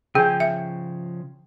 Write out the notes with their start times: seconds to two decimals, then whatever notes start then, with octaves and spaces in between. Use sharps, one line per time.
0.15 C#3 F3 G#4 G5 G#5
0.40 E5